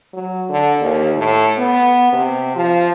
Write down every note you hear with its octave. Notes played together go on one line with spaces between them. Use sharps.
F#3
D3
D#2
A2
B3
C3
F3